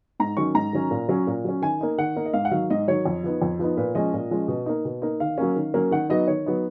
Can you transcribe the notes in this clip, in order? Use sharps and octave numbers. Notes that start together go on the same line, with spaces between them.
G#2 A#5
D#3 F#3 C#4 C#6
G#2 A#5
D#3 F#3 C#4
A#2
F#3 C#4
A#2
F#3 C#4
D#3 G#5
A#3 D#4
D#3 F#5
A#3 D#4
D#5
G#2 F5
F#5
D#3 F#3 F5
G#2 D#5
D#3 F#3 C#5
F2
F3 B3 D#4
F2
F3 B3 D#4
A#2 B4
F3 G#3 C#4 D#5
A#2
F3 G#3 C#4
B2
A#3 D#4
B2
A#3 D#4
D#3 F5
F#3 A#3 C#4
D#3
F#3 A#3 C#4
D#3 F#5
F#3 B3 D#4 D#5
D#3 C#5
F#3 B3 D#4